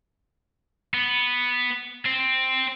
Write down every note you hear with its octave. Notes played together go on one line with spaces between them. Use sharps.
B3
C4